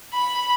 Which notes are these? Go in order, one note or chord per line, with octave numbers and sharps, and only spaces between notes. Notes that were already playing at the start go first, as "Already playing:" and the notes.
B5